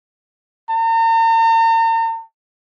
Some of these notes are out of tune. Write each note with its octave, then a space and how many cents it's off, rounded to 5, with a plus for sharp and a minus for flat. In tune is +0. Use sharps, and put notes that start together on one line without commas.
A#5 -45